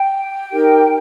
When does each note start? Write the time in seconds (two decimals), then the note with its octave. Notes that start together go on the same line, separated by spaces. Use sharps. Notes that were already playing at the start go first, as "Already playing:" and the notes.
Already playing: G5
0.52 D#4 G4 A#4